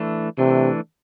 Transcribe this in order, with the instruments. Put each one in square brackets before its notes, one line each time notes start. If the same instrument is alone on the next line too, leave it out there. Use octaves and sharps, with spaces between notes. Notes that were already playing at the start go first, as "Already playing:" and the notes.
Already playing: [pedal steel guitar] E3 A3 D4
[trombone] C3 [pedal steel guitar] E3 A3 D4